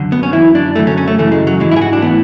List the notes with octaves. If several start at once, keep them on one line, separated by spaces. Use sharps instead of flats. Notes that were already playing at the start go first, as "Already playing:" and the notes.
Already playing: F#2 D3
B3
C#4
F#2 E3 E4
D4
F#2 D3 A3
C#4
C#4
A3
F#2 C#3 E3 A3
G#3
F#3
G#2 E3 G#3
E4
G#4
F#4
D4
A2 E3 B3